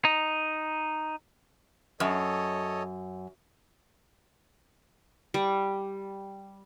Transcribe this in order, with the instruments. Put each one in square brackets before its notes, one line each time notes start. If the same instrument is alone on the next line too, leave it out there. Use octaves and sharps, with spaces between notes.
[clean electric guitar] D#4
[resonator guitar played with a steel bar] F#2 [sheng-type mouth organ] A4 C#5 D#5
[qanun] G3